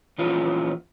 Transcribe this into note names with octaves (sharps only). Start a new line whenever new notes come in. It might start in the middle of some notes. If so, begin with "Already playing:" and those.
A#2 E3 F3 C#4 F4